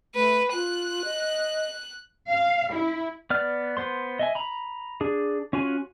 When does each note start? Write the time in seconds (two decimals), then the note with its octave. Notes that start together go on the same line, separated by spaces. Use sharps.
0.15 A3 B4
0.53 F4 F#6
1.05 D#5
2.30 F5
2.72 E4
3.30 B3 D5 F6
3.77 B3 C5 C6
4.19 D#5 E5 G#5
4.35 A#5 B5
5.01 D4 G#4
5.53 C#4 F4 F#4 G#5